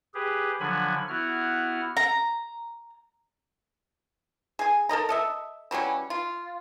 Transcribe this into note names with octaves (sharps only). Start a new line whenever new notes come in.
G4 G#4 B4
D3 F3 F#3 D4 G#5 B5
B3 E4 F#4 F6
A#5
G#4 G#5
A4 A#4 D#5 A#5
A4 D#5 E5
E3 F#3 G3 C#4
F4